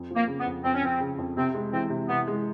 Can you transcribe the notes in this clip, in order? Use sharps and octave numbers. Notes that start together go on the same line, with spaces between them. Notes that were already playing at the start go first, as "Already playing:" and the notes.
Already playing: F2
F3
A#3
C#3
B3
F2
F2 C4
C#4
F3 C4
C#3
F2
C3 C4
G#3
E3 C4
C3
C3 B3
G#3